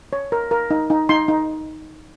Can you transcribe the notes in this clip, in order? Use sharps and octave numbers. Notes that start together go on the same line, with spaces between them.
C#5
A#4
A#4
D#4
D#4
D#4 C6
D#4